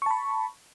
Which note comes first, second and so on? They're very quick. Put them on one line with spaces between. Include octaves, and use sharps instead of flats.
C#6 A5 B5